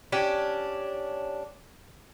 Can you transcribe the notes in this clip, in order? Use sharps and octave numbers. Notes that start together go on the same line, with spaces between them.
C#4 D4 G4